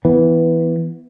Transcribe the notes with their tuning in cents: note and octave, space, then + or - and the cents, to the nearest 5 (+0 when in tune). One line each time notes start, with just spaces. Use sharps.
E3 +0 B3 +0